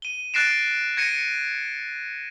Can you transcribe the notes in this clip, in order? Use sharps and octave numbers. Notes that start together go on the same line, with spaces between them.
D#7 G7
F#6 A6 A#6 C7 D7 E7
G#6 A#6 C#7 D#7